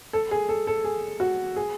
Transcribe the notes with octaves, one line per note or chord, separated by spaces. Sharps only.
A4
G#4
A4
A4
G#4
F#4
G#4